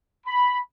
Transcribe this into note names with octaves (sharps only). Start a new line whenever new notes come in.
B5